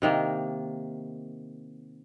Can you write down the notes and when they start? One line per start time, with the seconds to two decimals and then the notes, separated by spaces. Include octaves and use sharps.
0.02 C3 D#3 A#3